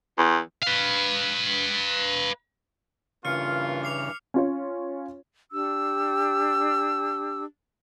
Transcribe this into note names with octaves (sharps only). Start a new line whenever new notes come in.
E2
B4 F5
G2 C#3 E3 A#3 F4 F6 C#7
D6 C7 F7
C#4 F4 C#5
D4 G4 E6